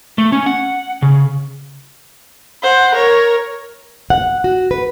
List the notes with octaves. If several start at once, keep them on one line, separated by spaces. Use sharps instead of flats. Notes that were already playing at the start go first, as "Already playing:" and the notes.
A3
C#4
F#5
C#3
C5 F#5
A#4 C#5
F#5
F#4
B4